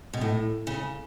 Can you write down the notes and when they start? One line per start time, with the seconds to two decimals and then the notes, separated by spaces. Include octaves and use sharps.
0.13 B2
0.21 A2
0.67 C#3